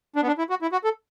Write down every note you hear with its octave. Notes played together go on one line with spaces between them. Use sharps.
D4
B3
D4
E4
F#4
E4
F#4
A4